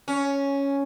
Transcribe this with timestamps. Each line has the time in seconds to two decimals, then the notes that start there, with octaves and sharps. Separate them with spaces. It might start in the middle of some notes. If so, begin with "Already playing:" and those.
0.08 C#4